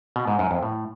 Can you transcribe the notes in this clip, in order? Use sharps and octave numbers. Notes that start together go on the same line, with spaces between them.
B2
G#2
F#2
F2
A2